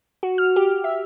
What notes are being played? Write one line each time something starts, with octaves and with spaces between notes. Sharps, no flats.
F#4
F6
G4
E5